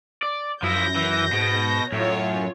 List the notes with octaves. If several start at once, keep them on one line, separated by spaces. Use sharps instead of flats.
D5
F#2 F3 E4 G6 A#6
E3
G#2 B2
F#2 A2 F4 C#5